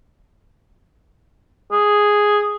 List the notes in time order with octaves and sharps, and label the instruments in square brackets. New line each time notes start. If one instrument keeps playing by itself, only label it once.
[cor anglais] G#4